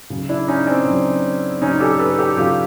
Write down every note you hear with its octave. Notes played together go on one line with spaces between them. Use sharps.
C#3 F#3
D4 E4
C#4 D#4
C4 D4
C#3 F#3
C#3 F#3 C#4 D#4
G4 A4
A4 B4
G4 A4
C#3 F#3 F4 G4